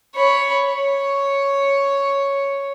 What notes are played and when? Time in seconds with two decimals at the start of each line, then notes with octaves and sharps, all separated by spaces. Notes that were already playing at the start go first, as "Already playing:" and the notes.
0.15 C#5 B5
0.71 C#5